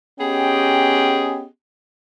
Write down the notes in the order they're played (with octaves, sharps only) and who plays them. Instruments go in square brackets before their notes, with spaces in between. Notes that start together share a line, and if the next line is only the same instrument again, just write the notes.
[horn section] B3 C#4 G4 G#4 D#5 G5